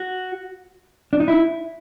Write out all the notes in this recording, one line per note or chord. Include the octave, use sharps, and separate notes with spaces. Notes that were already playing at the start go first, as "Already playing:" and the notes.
Already playing: F#4
D4
D#4
E4